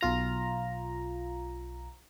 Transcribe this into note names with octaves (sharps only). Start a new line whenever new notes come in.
B1 F4 A#5